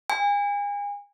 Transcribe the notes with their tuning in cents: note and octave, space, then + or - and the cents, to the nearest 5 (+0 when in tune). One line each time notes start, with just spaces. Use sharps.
G#5 -35